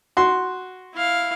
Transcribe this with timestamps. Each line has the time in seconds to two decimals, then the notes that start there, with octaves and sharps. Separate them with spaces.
0.17 F#4 C6
0.94 E4 F5